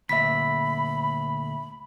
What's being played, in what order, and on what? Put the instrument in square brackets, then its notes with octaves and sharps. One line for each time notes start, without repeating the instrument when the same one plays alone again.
[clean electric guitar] D2 A#2 [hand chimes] E5 B6 [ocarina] B5